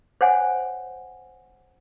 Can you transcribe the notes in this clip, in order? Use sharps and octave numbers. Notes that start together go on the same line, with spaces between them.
C5 C#5 F#5 G#5